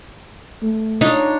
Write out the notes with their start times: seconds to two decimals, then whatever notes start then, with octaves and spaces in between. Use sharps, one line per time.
0.62 A3
1.01 D4 D#4 F4 C#5